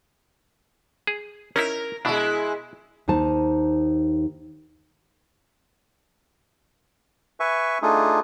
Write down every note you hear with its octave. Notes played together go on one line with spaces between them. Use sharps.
G#4
C#4 D#4 E4 A#4
B2 G#3 D4 E4
D#2 D#4 C5 A5
B4 E5 G#5 C#6
A3 D4 D#4 F4 G#4